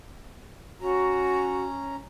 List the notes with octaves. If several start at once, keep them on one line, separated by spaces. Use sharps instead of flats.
C#4 F#4 A#5